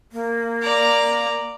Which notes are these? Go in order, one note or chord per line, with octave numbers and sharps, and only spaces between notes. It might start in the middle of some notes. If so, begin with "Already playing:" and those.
A#3
D5 A#5